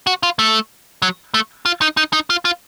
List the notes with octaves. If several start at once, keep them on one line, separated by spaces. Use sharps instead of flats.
F#4
F4
A3
F#3
A3
F4
D#4
D#4
D#4
F4
F4